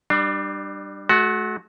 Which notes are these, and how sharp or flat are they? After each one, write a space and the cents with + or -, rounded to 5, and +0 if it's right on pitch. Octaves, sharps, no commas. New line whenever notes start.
G3 +0 D4 +30
A3 -40 F#4 +0